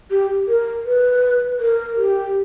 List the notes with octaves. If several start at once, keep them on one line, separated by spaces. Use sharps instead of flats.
G4
A#4
B4
A#4
G4